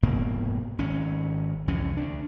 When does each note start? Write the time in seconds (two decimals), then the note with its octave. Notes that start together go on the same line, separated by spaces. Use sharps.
0.02 F1 G#2 B2 A#3
0.78 G#1 C#4
1.68 C2 F2 E3 C#4
1.97 D2 D4